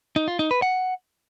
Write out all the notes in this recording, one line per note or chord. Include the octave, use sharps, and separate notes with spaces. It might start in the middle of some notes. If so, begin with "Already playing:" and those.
D#4
F4
D#4
B4
F#5